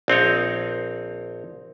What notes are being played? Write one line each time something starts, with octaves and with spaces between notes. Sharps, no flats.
A#1 C4 D#4 C#5